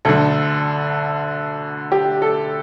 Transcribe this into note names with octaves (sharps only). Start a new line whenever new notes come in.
D2 D3 A4
G4
A4